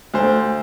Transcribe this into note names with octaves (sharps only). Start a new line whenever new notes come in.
D2 C5